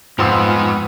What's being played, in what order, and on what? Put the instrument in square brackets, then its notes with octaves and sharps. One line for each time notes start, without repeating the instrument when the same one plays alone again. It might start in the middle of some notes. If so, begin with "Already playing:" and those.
[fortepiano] F2 C6 E6 [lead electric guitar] G#2 [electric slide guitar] F3 [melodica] B3